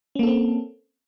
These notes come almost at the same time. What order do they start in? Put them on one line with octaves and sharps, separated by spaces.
C#4 A#3 A4 C4